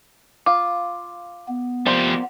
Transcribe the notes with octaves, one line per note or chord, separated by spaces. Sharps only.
F4 F5 D6
B3
F3 A#3 G4 C5 D5